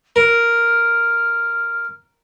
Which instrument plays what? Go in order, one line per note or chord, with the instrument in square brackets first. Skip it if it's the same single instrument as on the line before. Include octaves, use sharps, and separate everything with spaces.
[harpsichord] A#4 [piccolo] F6